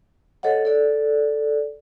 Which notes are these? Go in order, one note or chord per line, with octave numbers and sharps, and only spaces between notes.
A4 C#5 D#5 F#5
A4 D5